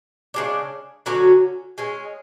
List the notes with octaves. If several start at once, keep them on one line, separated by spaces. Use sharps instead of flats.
C#3 G#3 D4
D3 F#3 C#4 F#4
G#3 C#4 G#4